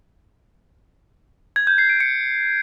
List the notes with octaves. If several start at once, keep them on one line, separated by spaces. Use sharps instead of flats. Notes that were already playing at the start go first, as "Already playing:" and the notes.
G#6
G6
C7
D7
C#7